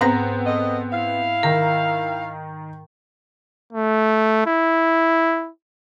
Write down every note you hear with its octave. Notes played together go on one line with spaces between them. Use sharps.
G#2 B3 C4 A#5 A#6
A4 B4 D#5
E4 F5
D#3 A#4 A#5
A3
E4